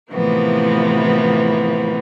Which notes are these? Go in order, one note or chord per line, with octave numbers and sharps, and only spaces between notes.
A2 C3 E3 F3 A#3 B3